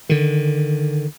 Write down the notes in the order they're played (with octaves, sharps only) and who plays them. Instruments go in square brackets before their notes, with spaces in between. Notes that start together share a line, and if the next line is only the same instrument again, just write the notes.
[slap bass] D3 D#3